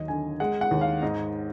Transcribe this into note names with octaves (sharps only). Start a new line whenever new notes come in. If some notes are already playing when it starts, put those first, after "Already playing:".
Already playing: D#2 F#3 D#5
D3 G#5
G#3 F#5
F#5
D#2
F5
G#2 D#5